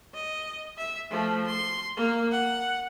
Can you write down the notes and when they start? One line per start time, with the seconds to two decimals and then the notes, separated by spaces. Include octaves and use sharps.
0.14 D#5
0.78 E5
1.10 F3 A3
1.47 C6
1.97 A#3
2.32 F#5